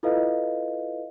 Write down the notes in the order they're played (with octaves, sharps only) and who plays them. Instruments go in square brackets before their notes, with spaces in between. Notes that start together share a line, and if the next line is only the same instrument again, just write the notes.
[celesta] E4 F4 A4 B4 D#5 F5